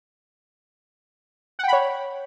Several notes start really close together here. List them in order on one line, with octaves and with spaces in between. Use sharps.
F#5 G5 B5 C#5